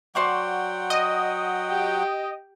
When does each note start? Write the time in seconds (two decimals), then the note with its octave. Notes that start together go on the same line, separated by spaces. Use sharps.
0.15 F#3 C5 D5 F#5 G5 C#6
0.90 D#5
1.69 G4